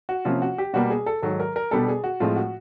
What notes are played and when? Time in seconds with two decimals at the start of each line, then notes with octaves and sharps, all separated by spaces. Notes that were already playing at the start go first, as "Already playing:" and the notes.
0.09 F#4
0.25 C3 F3 A#3 C#4 F4
0.42 F#4
0.58 G4
0.73 B2 G3 A#3 F#4
0.90 G#4
1.06 A4
1.22 G#2 D#3 F#3 A4
1.40 A#4
1.56 A#4
1.71 B2 G3 B3 D4 A4
1.88 G#4
2.04 F#4
2.20 A2 F3 G#3 C4 F4
2.36 F#4